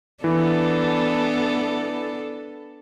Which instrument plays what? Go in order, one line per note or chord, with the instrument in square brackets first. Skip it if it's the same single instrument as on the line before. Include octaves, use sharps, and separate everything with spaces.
[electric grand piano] E3 [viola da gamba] B3 D4 A4